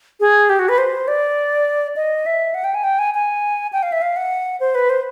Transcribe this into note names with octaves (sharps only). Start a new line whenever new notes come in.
G#4
G4
F#4
B4
C5
D5
D#5
E5
F#5
G5
G#5
G5
G#5
G#5
G5
F5
E5
F5
F#5
C5
B4
C5